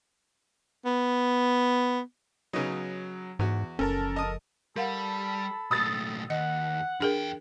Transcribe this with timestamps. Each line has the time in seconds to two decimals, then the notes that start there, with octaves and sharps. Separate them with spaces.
0.86 B3
2.53 C#3 F#3 B3 D#4
3.39 E2 G#2 F#4
3.79 F#1 F3 C#4 A4 A#4 A5
4.16 D#5 D#6
4.76 G3 A4 A#4 F5 F#5 A5 B5
5.71 B1 A2 D#6 E6 A6
6.30 D#2 D#5 F#5
7.00 E2 D4 G#4 A#4 G5